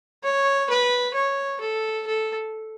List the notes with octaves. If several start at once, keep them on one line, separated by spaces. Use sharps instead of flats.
C#5
B4
C#5
A4
A4